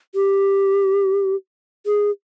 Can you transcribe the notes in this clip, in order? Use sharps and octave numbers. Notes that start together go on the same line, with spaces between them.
G4
G#4